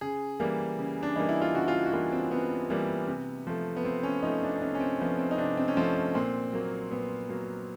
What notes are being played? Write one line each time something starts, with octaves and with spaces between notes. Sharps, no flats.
C#3 G#4
E3 G3 A#3
C#3
D4
E3 G3 A#3 D#4
E4
F4
C#3 F#4
F4
F#4
F#4
E3 G3 A#3 F4
C4
C#3 B3
E3 G3 A#3
C3
F3 A3
B3
C3 C4
C#4
F3 A3 D#4
D4
D4
C3 C#4
C#4
C4
F3 A3 B3
C4
D#4
C3 D4
C4
C#4
F3 A3 C4
A#2 C4
F#3 A#3
A#2 B3
F#3 A#3